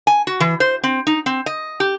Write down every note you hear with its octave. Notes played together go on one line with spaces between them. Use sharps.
G#5
F#4
E3
C5
C4
D#4
C4
D#5
G4